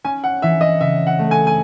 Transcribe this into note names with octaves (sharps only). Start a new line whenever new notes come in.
C#4 G#5
F#5
E3 E5
D#5
C#3 E5
F#5
A3
G#5
G#5